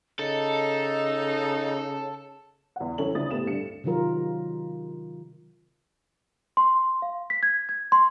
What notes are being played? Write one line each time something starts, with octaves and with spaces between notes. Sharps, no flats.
C#3 D#4 A4 D#5
E2 F#5
F2 E3 C#4 A4 F#7
D2 C#3 E4 D5 D#6 A6
A2 C3 B3 E4 A4 E7
D2 G2 D4 A4 C#7
C3 D#3 F#3 F4 A#4
C6
F5
B6
G#6
G#6
C6